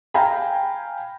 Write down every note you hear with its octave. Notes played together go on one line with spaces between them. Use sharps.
F5 G5 G#5 A#5 B5